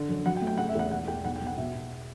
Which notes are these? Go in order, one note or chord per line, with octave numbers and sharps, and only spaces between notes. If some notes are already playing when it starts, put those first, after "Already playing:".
Already playing: D3
F#2
F#3 F#5
G5
A3
G5
C#3 F#5
E5
E2 F#5
E1 F#5
E2 G5
B1 F#5
G5
B1
F#5
B2 E5
B2